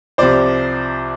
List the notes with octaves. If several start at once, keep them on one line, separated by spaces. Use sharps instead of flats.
C2 C3 F3 C5 D5